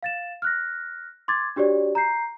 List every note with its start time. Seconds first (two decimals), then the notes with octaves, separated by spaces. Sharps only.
0.03 F5 A6 E7
0.42 F6 F#6 A#6
1.28 C6 D6 G#6 A6
1.56 D4 F#4 G4 C#5 D5
1.95 A#5 G6 C7